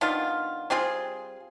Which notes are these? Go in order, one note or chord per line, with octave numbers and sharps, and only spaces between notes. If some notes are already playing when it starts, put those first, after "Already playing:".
D#3 B3 D4 F4
G3 C4 F4 G#4